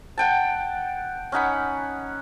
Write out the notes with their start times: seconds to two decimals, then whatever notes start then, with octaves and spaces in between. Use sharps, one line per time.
0.18 F#5 G5 A5
1.32 C#4 D#4 F#5 B5